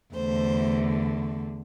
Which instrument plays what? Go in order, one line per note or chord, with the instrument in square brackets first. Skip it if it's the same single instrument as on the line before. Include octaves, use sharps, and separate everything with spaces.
[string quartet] E2 D3 A3 C5